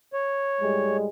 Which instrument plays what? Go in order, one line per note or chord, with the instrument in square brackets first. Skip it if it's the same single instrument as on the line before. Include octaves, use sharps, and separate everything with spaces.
[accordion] C#5
[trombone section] A2 G3 G#3